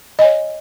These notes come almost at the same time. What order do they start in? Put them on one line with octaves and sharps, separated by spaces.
D#5 G#5 C#5